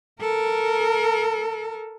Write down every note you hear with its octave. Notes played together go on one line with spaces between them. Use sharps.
A4 A#4